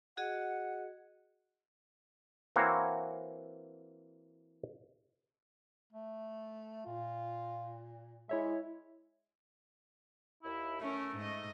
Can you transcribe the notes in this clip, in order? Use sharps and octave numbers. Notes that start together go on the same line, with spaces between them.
F#4 G#4 D#5 F#5
E3 A#3 C4 F#4 C#5
A3
A#2 F4
G#3 E4 C#5 E5
D#2 E4
A3 C#4 A#4
G#2 D#5